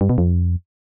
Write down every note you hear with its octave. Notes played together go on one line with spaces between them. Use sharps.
G2
B2
F2